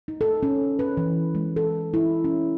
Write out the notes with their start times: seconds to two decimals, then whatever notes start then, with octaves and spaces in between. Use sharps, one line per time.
0.08 D#4
0.21 A4
0.43 C#4
0.79 B4
0.97 E3
1.35 G#3
1.56 A4
1.94 E4
2.24 C#4